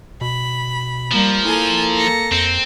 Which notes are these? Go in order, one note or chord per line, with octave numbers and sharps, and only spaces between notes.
B2 B5
F3 G3 A#3
A#3 E4 A4 G#5
A#6 C#7
F2 C4